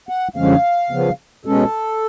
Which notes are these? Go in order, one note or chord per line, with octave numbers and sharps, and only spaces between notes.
F#5
F#2 D3 F3 G#3 C#4 F5
C#3 F3 B3
B2 G#3 C#4 A4